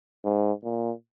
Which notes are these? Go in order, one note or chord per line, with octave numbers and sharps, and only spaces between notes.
G#2
A#2